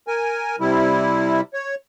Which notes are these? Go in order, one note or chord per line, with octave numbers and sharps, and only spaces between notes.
A#4 G#5
C3 G3 E4
C#5